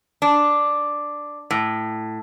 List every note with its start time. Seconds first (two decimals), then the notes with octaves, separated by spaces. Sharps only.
0.22 D4
1.51 A2